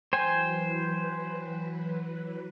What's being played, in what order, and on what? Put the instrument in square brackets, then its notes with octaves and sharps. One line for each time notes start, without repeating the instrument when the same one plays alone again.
[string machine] E3 F#3 B4 [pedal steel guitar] C5 G5 G#5